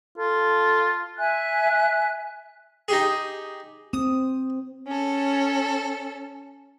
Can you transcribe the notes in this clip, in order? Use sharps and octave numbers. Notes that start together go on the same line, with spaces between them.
F4 A4
E5 G#5 F#6
D#4 G4 G#4
C4 D#6
C#4 A4